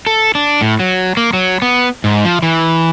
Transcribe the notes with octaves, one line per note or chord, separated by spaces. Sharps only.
A4
D4
A2
F#3
A#3
F#3
B3
G#2
F3
E3